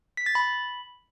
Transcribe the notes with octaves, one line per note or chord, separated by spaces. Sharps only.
B6
A6
B5